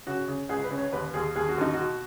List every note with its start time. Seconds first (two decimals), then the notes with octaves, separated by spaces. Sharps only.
0.07 C#3 F#4
0.28 C#3
0.49 C#2 G#4
0.64 B4
0.71 C#3
0.78 C#5
0.93 D#2 B4
1.14 D#2 G#4
1.35 D#2 G#4
1.49 F#4
1.58 D#2 D#4
1.73 F#4
1.79 B2